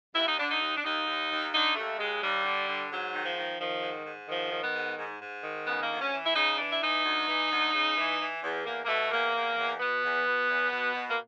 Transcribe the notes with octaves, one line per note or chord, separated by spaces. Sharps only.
D#2 E4
D#4
D3 D4
D#4
D#2
D4
D#2 D#4
D#2
D#2
D3 D#4
D#2 A3
D#2 G#3
D#2 G3
D3
D3
G#2 F#3
D#3
F3
D#3
D#3 F3
G#2
G#2
D#3 F3
D#3
B3
G#2
G#2
G#2
D#3
C#3 B3
A#3
D2
C#4
E3
E4
C#3 D#4
E3 D4
E4
E3 D#4
D2
E3
D2
C#3
E3
E3
E2
E2 A#3
A#3
B2 A3
E2 A#3
E2
E2
B2 B3
E2
B2
E2
B2
B2
A#3